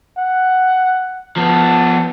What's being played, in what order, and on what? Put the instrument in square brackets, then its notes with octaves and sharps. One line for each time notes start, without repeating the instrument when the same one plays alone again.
[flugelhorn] F#5
[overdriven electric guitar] F3 B3 [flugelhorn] A5